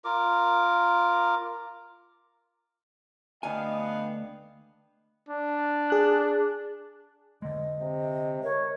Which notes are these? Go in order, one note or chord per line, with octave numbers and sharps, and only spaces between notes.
F4 A#4 D6
D2 B3 D4 D#5 F5 G5 G#5
D4
G#4 F#6
D3 G#3 D#5
C3
A#4 C#5